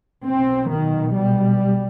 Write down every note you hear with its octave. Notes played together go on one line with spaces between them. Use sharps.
B1 B2 C4
D#3
G3